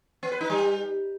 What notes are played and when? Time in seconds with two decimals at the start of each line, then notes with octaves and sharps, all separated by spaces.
0.23 B3
0.32 B4
0.41 D#4
0.50 G3